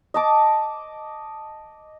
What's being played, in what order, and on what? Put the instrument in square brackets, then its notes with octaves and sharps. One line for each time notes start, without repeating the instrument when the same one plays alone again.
[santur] D#5 A5 D6